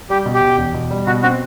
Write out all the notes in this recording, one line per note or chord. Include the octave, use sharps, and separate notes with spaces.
G3 G4
B2
G4
B2
E2
B2
G3
B2 F#4
C4 F#4